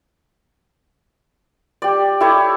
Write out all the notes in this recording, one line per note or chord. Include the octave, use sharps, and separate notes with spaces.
G4 D5
E4 G4 A4 C#5